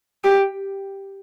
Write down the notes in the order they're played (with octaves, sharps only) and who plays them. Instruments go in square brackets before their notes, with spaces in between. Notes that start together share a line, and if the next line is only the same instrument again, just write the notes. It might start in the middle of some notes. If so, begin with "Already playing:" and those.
[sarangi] G4